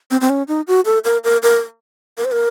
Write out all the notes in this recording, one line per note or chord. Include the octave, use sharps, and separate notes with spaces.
C4
C4
C#4
D#4
F#4
A4
A#4
A#4
A#4
A#4
C5
A#4